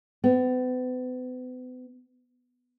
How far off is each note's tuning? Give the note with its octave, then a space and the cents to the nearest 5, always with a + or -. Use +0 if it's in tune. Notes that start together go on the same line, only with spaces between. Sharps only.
B3 +40